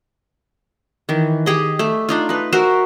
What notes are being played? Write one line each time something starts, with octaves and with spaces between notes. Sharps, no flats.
D#3 E3
G4 G#4 D#5
A3
D4 D#4 F4
D#4 B4
F#4 A#4 C5 E5